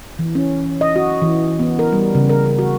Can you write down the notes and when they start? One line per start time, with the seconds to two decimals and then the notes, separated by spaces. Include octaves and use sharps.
0.19 E3
0.35 C#4
0.81 D#5
0.96 F#4
1.22 E3
1.59 B3
1.79 A#4
1.92 G3
2.15 C#3
2.30 A#4
2.59 F#4